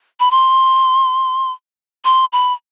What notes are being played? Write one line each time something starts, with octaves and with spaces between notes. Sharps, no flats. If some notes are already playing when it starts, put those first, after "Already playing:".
B5
C6
C6
B5